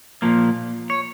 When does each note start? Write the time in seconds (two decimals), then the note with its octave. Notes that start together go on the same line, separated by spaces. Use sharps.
0.22 A#2 F3 A#3
0.90 C#5